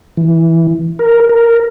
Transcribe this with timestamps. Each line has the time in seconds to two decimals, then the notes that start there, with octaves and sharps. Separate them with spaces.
0.17 E3
0.99 A#4
1.29 A#4